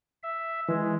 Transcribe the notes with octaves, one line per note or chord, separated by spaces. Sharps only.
E5
E3 G#3